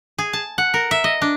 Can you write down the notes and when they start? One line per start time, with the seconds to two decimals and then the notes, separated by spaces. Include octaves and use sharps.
0.18 G#4
0.33 A5
0.58 F#5
0.74 A#4
0.91 E5
1.04 D#5
1.22 D4